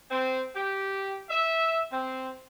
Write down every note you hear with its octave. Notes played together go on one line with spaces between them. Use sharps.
C4
G4
E5
C4